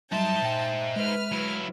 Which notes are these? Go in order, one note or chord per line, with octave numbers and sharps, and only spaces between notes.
F#3 G3 D#4 C5 E5 A5
A#2 G5
G#3 B4 F6
F#3 E4